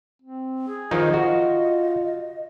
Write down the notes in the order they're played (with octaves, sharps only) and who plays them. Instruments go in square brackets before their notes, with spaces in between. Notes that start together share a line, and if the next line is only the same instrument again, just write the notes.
[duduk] C4
G#4
[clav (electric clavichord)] D#3 F3 D#4 [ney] D#5
[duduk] F4 [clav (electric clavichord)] F#4